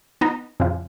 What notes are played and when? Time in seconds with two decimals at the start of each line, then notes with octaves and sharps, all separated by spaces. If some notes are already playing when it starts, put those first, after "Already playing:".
0.21 B3 D#4
0.60 F2 C#3 F3